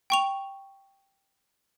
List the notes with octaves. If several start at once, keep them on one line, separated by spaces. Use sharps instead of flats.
G5 C#6 F7